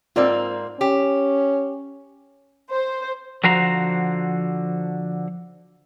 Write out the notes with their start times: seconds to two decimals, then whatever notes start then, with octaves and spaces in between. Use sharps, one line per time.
0.16 G#2 A#3 C4 F4 D5
0.81 C#4 G4
2.72 C5
3.44 D3 F3 F#4 C5 A#5